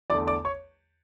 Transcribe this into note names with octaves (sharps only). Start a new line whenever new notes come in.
E2 D3 A3 D5 D6
D5 D6
C#5 C#6